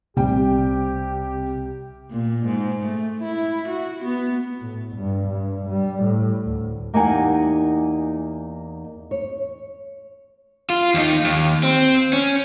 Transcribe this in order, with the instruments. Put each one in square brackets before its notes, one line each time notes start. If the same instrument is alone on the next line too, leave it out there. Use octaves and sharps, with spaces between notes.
[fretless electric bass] C2 [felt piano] C3 G3 G5 [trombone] G4
[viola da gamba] A#2
G#2
A3
E4
F#4
B3
[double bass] A2
G2
G2
G3
A2
D2
[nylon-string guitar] E2 A#3 D#4 G4 F#5 G#5
C#5
[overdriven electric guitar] F4
D#2 D#4
D#2
C4
C#4